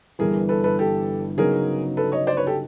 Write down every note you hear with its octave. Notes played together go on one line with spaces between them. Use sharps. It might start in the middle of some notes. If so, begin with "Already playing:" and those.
G1 G2 E3 G#4 A#4
A4 B4
A4 B4
G4 A4
C#3 F#3 B3 D#4 F#4 G#4 A#4
A4 B4
C#5 D#5
C5 D5
B4 C#5
G4 A4